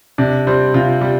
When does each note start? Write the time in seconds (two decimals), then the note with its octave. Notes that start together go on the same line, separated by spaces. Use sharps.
0.18 C3 D4
0.47 G3 C4
0.74 C3 F4
1.01 G3